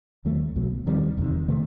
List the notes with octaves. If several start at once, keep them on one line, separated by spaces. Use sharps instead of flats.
D#2 D#3 F#3 A3
C2 B2 F#3
D#2 D#3 G3 C4
E1 E2 C3 D#3
C3 D#3 A3